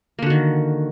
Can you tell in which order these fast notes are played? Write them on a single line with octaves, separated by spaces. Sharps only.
A#3 D3 F#4 D#3